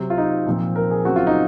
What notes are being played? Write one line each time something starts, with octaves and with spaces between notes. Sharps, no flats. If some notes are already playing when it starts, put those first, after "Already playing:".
Already playing: C3 F#3 C4
F4
D#4
A#2 F3 C4
A#4
G#4
C#3 F#3 C4 F#4
F4
D#4